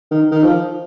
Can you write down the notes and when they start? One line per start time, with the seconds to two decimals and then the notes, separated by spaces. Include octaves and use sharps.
0.11 D#3
0.32 D#3
0.44 F3